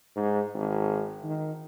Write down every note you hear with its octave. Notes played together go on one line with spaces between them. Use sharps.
G#2
G#1
D#3